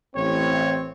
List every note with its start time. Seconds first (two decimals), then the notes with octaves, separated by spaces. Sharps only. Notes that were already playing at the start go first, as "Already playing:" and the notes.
0.16 A1 C4 C#5